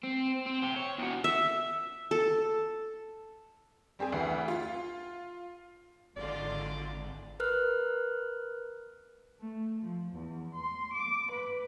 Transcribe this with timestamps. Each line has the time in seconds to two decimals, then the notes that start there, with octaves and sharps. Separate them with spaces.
0.03 C4
0.46 C4
0.62 C4 G4
0.76 C#5
0.99 E2 F#4
1.24 E5
2.11 A4
3.99 G3 C4 G4 G#4
4.12 D2 E3 F#5 C7
4.48 F4
6.17 G#1 D3 F#3 G#3 F4 D5
7.40 A#4 B4 F6 F#6
9.40 A3
9.82 F3
10.14 E2
10.54 C6
10.94 D6
11.31 B4